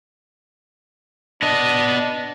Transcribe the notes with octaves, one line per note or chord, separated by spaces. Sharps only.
B3 D4 D#5